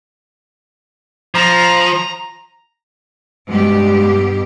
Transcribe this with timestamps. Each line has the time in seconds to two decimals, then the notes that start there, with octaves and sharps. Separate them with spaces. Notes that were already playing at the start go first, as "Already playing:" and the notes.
1.35 F3 A#5
3.50 G2 B2 G#3 G4